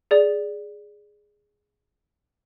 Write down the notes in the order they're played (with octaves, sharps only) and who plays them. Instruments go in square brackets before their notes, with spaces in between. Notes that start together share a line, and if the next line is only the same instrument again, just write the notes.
[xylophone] G#4 D5